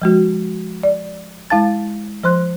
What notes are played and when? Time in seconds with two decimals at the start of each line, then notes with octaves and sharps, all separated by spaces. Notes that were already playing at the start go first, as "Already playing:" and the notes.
0.02 F3 G#3 F#4
0.83 D5
1.50 G#3 E4 F5 A5 A6
2.24 F3 C5 C6 F#6